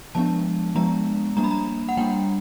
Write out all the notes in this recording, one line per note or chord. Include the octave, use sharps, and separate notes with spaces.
F3 G#3 B3 D4 A5
F3 G#3 B3 D4 A#5
G3 A#3 D4 A#5
B5
A#5
F#5
G3 A#3 D4 G5